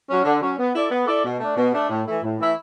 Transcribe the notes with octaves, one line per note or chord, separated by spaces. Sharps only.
F#3 C#4
D3
F#3 C#4
B3
E4 A4 D5
B3
E4 A4 D5
B2
A3 D4
B2
A3 D4
A2
E3 A3 E4
A2
E3 A3 E4